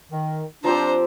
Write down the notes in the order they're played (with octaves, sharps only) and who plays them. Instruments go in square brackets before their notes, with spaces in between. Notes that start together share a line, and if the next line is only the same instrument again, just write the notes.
[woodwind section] D#3
[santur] F3 C4 G4 [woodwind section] D4 [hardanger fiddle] C5 A#5